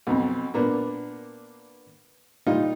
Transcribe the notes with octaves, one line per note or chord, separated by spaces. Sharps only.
B1 F2
A#2 A#3 B3 D4
A#2 G3 D#4 F4